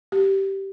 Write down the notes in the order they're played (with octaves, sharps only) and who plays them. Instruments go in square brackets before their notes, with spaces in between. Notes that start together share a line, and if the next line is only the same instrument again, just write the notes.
[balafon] G4